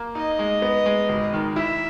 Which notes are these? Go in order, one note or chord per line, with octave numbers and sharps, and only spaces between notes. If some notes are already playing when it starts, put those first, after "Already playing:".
Already playing: A#3
D#4 D#5
G#3
B3
G#3
G#1
D#3
E4 E5